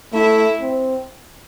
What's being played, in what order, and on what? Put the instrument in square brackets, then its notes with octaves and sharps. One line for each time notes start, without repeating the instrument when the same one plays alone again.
[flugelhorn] A3 [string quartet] E4 E5
[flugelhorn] C4